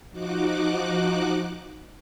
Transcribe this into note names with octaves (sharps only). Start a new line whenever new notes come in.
F3 D#4 F#4 D6 F#6